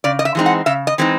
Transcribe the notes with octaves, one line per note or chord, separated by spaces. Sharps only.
C#3 D5
D#5
E5
E3 G#3 C4 D#4
F#5
C#3 E5
D#5
E3 G#3 C4 D#4